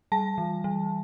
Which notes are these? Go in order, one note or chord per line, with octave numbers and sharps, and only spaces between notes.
G3 A5
E3
G3